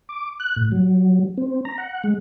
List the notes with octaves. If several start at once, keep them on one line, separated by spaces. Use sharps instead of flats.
D6
F#6
A2
F#3
C4
A#5
F#5
G#3